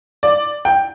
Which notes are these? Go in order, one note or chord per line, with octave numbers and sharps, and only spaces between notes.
D5
G5